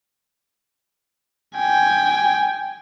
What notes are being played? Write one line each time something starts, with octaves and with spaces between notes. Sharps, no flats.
G5 G#5